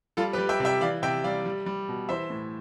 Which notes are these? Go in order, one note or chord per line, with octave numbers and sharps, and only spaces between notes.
G3 F4 A4
G4 B4
G3
E5 G5
C3
E5 G5
E3 D5 F5
C3 E5 G5
G3 D5 F5
G3
G3
B2
E3 C5 E5
A2